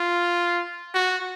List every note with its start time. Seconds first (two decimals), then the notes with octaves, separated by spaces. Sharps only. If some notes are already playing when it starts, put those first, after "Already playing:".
Already playing: F4
0.94 F#4